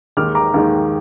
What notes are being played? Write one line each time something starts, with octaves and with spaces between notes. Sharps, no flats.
D#2 D#3 G#3 D#4 D6 F6
A#5 D6
D#2 D#3 G#3 D#4